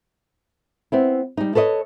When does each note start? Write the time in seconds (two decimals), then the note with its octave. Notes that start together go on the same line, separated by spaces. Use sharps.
0.92 B3 C4 E4
1.37 G3 D#4
1.55 A4 B4 C#5 D#5